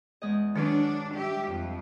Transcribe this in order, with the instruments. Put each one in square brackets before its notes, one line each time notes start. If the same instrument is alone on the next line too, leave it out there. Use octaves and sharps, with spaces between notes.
[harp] E2 G#3 D#5
[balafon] D#3 [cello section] F#3 D4 [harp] G#4 F6
[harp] G2 [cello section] G4 E5
[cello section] F2